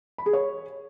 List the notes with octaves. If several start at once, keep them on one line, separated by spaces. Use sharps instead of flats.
B5
G#4
C#5